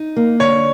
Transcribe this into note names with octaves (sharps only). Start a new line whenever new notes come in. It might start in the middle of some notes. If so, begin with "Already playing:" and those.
Already playing: D#4
A#3
D3 C#5